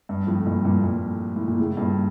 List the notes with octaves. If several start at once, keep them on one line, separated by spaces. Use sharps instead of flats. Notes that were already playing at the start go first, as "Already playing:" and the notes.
G2
F2 A2
G2 A#2
G2 A#2
G2 A#2
A2
A#2
A2 C#3
G2 A#2